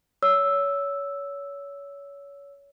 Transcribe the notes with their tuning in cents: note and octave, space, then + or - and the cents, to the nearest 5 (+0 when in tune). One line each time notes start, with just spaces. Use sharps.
C#5 +25 E6 +0